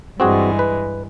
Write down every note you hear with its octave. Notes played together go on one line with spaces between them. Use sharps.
G2 E3 G#3 C4 F#4 G#4
B4